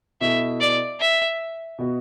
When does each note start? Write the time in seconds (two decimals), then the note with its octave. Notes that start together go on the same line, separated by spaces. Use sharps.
0.21 B2 B3 E4 A4 E5
0.60 D5
1.00 E5
1.78 B2 B3 F#4